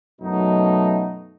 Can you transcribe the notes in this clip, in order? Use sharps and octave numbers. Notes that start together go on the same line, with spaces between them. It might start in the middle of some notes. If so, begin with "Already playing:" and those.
F#2 B2 F#3 A3 D#4